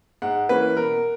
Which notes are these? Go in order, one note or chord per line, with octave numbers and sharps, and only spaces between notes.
G#2 F#5
E3 A#3 C#4 B4
B2 A#4